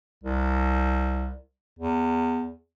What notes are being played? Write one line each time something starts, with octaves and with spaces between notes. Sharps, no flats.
C2
E2